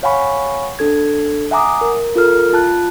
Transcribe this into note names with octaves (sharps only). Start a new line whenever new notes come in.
C#5 F5 F#5 G#5 B5 C#6
D4 A4 G#6
E5 F#5 G#5 A#5 D6 D#6
A#4
F4 A4 A#4 F6
F4 A5 F#6